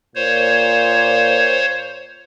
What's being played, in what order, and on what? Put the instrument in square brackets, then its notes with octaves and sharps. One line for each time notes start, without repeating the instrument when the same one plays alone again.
[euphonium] A#2 [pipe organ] C5 C#5